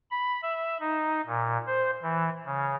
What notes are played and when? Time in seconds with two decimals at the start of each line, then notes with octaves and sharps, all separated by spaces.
0.11 B5
0.42 E5
0.80 D#4
1.26 A#2
1.67 C5
2.02 E3
2.46 C#3